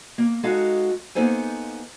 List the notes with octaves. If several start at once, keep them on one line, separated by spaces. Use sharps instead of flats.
A#3
G#3 D#4 F#4 A4 F5
A#3 B3 D#4 A4 C5 G#5